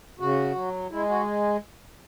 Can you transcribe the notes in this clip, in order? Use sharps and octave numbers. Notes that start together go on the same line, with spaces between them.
C#3 F#4
F#3
G#3 E4
F#4